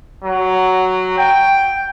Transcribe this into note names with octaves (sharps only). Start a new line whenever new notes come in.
F#3
G5